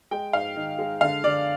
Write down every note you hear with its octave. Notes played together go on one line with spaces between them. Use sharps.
G#3 G5
G#2 F5
D#3
G#3
D3 F5
D3 D5